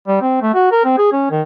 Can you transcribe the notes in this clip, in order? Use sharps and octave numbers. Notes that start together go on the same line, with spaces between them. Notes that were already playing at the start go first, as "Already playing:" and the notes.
G3
C4
A3
F#4
A#4
C4
G#4
C#4
D#3